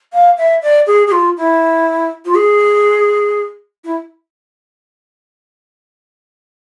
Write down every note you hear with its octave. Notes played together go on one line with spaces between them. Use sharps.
F5
E5
D5
G#4
G#4
F4
E4
F4
G#4
E4